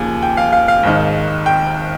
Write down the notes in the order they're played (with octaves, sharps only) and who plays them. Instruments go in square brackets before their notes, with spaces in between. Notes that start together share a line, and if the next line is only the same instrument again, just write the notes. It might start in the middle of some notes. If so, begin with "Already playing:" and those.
Already playing: [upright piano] D#2 C#3 F3 A#3 G#5
G5
F5
F5
F5
G#1 G#2 D#3
G5